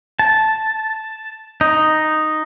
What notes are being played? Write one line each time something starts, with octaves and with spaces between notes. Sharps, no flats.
A5
D#4